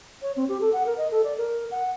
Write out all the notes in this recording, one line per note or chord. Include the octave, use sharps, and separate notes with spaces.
C#5
C4
G4
A4
F#5
A#4
D#5
A4
D5
A#4
F#5